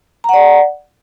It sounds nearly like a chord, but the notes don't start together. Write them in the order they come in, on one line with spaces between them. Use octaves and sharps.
A#5 F#5 D5